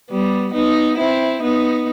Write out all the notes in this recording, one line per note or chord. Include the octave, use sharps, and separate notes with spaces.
G3 B3
B3 D#4
C4 E4
B3 D#4